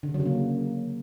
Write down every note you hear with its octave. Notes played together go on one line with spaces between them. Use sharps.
D3
C#3
F#3
C#3
A#3